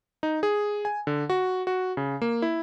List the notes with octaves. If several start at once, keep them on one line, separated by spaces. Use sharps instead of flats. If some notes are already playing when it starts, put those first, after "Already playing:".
D#4
G#4
G#5
D3
F#4
F#4
C#3
A#3
E4